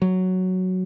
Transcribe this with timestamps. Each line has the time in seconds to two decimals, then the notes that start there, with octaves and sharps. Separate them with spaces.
0.02 F#3